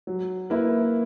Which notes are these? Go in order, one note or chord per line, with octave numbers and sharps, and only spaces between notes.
F#3
A#3 E4 B4